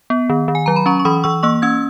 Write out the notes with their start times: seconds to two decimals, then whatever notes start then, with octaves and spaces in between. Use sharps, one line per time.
0.10 B3
0.29 D#3
0.48 D#3
0.55 G#5
0.66 F#3 A#5
0.76 B5
0.86 C#4 A#5 C#6
0.99 C#6
1.05 E3 B5 D#6
1.24 E3 C#6 E6
1.43 A#3 C#6 E6
1.62 C#4 E6 G#6